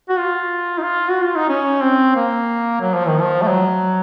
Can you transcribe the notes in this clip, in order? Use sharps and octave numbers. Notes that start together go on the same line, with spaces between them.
F#4
F4
D#4
F4
F#4
F4
D#4
C#4
C4
A#3
F#3
F3
D#3
F3
A3
F#3